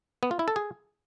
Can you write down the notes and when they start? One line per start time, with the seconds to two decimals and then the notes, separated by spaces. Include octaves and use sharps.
0.23 B3
0.31 F4
0.39 E4
0.48 A4
0.56 G#4